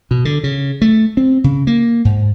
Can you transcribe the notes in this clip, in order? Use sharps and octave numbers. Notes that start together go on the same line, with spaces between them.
B2
D3
C#3
A3
C4
C#3
A#3
G#2